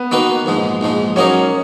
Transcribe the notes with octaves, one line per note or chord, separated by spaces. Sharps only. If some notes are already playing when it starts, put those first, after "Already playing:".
Already playing: B3
D#3 A#3 D#4 F#4 B4
A#1 G#2 F3 G#3
A#1 G#2 F3 G#3
F#3 A#3 C#4 D#4 A#4 D#5